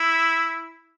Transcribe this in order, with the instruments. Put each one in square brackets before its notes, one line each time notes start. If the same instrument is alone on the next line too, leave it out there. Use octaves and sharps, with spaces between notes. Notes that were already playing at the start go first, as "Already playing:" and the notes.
Already playing: [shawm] E4